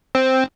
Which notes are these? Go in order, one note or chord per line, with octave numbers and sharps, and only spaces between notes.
C4